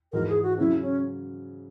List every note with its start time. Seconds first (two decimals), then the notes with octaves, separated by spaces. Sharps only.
0.12 G#2 E3 G#3 D#4 F#4 A#4
0.28 G#4
0.43 F#4
0.58 C#3 F#3 C#4 E4
0.82 C#4